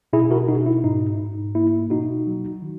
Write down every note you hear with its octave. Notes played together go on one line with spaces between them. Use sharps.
B2 E4 G#4
F#4 A#4
B2 D#4 F#4
E4
G#2 D#4
G#2
A#3 E4
B2 D#4 F#4
F#3
D#3